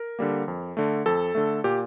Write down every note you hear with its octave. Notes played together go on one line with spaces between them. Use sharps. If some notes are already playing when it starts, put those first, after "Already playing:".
Already playing: A#4
D3 G3 A#3
F2
D3 A3
F2 A4
D3 A3
A#2 G4